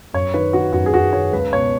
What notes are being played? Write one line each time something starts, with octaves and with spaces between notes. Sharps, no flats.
F#2 C#5
D#3 B4
D#3 F#4
F#2 F#4
G#4
F#2 F#4
D#3 C#5
C#2 B4
B2 C#5